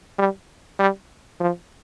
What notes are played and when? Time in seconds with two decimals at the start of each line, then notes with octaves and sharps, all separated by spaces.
0.19 G3
0.79 G3
1.40 F3